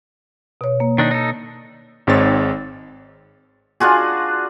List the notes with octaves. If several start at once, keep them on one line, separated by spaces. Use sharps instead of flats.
B2 C#5
A#3
D#3 D4 D#4
D#4 A4
G#1 G#2 G#3 C4 C#5 A6
D4 F4 F#4 G#4